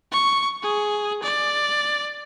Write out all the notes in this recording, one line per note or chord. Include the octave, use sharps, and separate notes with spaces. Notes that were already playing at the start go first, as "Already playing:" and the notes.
C#6
G#4
D5